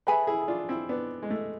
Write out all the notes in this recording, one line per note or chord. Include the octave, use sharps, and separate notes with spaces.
G#4 A4 B4 E5 G#5 B5
E4 G#4
G#4
D4 F4
D4
C4 E4
B3 D4
G#3
A3